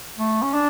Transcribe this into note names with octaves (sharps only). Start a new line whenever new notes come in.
A3
C#4
D4